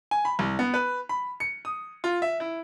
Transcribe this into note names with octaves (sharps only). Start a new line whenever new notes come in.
G#5
B5
C2
B3
B4
B5
C#7
D#6
F4
E5
E4